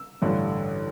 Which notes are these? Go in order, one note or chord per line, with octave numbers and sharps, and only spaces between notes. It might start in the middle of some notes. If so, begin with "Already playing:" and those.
Already playing: E6
A1 G2 D3